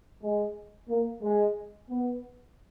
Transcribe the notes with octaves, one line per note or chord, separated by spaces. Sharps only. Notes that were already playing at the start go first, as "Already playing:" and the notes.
G#3
A#3
G#3
B3